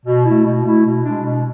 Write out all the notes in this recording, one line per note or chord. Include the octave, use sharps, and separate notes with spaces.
B2
A3 E4
B2
A3 E4
B2
G#3 D4
B2